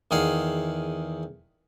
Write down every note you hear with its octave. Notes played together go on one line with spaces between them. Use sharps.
E2 D#3 G#4 F5 F#5